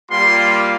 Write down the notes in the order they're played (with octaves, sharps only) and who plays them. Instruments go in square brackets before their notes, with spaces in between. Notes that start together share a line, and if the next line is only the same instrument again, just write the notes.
[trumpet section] G3 A#3 F4 C6